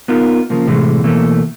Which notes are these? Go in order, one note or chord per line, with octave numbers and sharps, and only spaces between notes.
B3 D#4 F4 A#4
C#3 F3 A#3
A2 C3 E3 G#3 A3
B2 E3 A3 A#3